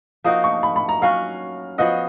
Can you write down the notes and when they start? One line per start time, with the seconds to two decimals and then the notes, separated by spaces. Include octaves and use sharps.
0.24 F3 A#3 D#4 F#4 D#6
0.44 C#6
0.63 B5
0.76 B5
0.89 A#5
1.02 F#3 C#4 F#4 F5
1.78 F3 B3 F#4 D#5